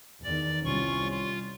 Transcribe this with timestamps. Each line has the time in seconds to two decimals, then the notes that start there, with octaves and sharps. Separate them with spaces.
0.24 E2 D#3 D5
0.65 C2 G3 C#4 F4 C#6
1.11 F4